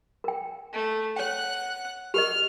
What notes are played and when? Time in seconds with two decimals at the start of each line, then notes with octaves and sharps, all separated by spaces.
0.24 A#4 G5
0.73 A3
1.16 C#5 F#5 G5 F#6
2.14 G4 A#4 D#5 F6